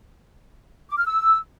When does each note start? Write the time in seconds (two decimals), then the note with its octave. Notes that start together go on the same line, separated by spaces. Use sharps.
0.89 D6
0.97 F6
1.06 E6